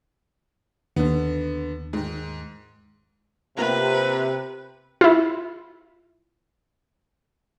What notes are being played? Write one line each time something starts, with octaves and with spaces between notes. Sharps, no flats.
D#2 D3 B3
G#2 D#3
C3 A#3 B3 F4 B4
E4 F4